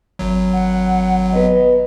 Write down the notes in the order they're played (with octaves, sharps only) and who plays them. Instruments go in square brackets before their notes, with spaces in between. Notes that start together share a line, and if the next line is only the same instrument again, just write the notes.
[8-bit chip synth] G#1 F#3
[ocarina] F#5
[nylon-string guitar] B3 B4 [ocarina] D#5